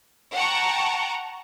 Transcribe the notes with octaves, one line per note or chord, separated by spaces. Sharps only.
F#5 G5 A5 A#5 C#6